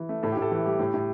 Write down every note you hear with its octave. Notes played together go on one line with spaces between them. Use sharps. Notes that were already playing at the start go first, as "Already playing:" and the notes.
Already playing: E3
A3
A2 A4
G4
A2
A4
E3 G4
G3 G4
A2 G4
A2